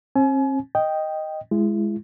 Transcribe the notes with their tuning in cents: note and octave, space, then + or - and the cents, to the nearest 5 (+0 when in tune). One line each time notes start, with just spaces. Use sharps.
C4 +45 G#5 +35
D#5 +0 G5 +0
G#3 +0 E4 +35